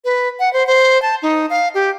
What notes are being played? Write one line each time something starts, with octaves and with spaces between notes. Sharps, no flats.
B4
F#5
C5
C5
A5
D#4
F5
G4